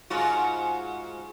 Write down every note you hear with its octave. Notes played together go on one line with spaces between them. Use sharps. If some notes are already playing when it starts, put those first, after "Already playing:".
G#2 F4 F#4